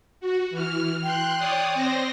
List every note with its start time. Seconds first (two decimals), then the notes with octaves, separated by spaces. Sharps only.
0.20 F#4
0.50 E3 F6
1.03 G5 C6 F#6
1.37 C#5 D5 D#6
1.73 C4 C5 A#6